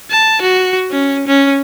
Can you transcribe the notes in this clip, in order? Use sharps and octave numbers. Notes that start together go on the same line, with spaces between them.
A5
F#4
C#4
C#4